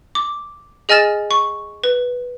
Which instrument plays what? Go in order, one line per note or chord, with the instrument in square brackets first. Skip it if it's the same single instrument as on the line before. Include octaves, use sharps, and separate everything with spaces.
[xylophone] D6
G#4 D#5 G#5 F6 A6 E7
C#6
B4